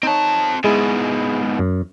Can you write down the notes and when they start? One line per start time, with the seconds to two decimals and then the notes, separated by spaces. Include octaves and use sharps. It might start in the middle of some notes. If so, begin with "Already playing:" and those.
0.03 C4 D#4 C#5 A5
0.64 G#2 B2 G#3 E4 G#4
1.59 F#2